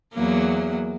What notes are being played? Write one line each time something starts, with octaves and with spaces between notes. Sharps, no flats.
E2 F#3 A#3